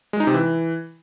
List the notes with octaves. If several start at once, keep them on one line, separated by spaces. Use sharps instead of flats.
G#3
D#4
C3
E3